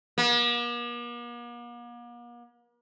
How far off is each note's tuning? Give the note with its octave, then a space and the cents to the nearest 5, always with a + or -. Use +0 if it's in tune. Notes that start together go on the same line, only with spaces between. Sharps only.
A#3 +45